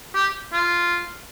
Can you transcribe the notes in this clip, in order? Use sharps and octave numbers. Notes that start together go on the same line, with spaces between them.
G4
F4